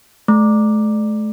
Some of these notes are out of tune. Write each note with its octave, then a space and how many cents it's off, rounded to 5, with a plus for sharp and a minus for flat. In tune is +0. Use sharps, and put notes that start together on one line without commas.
A3 -40